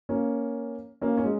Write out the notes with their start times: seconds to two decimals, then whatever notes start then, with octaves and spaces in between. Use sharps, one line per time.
0.09 A#3 C#4
1.01 A#3 C#4
1.17 C#4
1.25 G#3